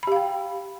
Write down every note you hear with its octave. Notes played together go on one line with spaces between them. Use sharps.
G4 F5 G5 B5